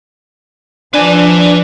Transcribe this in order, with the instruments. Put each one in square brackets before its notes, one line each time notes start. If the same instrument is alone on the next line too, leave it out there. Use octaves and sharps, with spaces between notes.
[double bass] F3 [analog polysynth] D4 [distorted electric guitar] B4 G#5